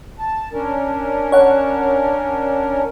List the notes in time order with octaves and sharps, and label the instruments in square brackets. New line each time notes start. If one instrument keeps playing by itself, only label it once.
[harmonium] A5
C#4 D4 A#4
[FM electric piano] C#5 F#5